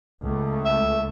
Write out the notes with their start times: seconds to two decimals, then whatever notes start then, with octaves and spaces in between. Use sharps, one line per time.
0.24 C#2 A3
0.65 E5